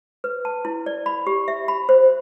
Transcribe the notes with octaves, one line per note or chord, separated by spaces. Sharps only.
B4
A5
E4
D5
B5
G4
E5
B5
C5